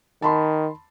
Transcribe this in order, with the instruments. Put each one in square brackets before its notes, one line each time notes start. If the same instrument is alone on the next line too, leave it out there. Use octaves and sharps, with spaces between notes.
[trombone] D#3 [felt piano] A5 B5 C6